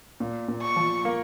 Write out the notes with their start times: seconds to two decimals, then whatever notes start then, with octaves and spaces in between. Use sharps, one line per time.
0.20 A#2
0.48 A#2
0.62 C#6
0.76 F3
1.05 A#3